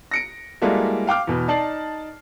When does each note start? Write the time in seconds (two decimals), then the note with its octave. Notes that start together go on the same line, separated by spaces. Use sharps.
0.11 A#6 C#7 D7
0.62 G3 G#3 A#3 E4 F#4 A4
1.07 F5 G5 D6 F6
1.27 E2 B2
1.48 D#4 D5 A5 C7 F#7